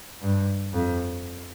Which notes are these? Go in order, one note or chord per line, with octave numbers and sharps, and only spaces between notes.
G2
F2